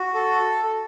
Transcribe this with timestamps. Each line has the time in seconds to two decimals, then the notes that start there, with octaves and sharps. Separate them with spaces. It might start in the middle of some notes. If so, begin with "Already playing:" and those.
Already playing: F#4
0.14 A4